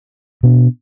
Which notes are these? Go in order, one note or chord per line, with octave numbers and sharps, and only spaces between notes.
B2 B3 D4